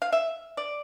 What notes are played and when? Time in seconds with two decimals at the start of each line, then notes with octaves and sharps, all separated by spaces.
0.02 F5
0.12 E5
0.57 D5